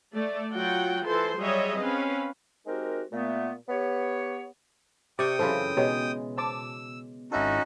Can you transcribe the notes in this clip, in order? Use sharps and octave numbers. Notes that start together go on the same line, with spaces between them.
A3 D5
F#3 F4 F#4 F#5 G5
E3 A4 C5 C6
F#3 G3 G#4 C#5 D#5 E5
C4 C#4 B4 F5
G#3 C4 D#4 F#4 G4 A#4
A#2 A3 B3
B3 G4 C#5
C3 D5 G5 C#6 D#6
F#2 C#3 E3 F4 A4 C5
B2 G#3 D#4 G4 C#5
C5 A5 D6 E6
G#1 C#4 D#4 E4 F#4 A4